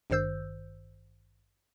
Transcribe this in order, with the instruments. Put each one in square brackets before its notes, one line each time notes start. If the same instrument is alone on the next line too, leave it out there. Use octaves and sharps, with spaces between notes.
[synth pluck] G#1 G2 D#3 C5 E6 G6